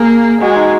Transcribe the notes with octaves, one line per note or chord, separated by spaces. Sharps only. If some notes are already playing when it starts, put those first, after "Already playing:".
Already playing: A#3 G#4
G#3 F#4
D#4